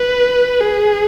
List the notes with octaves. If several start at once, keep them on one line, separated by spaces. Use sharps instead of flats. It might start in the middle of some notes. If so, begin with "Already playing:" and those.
Already playing: B4
G#4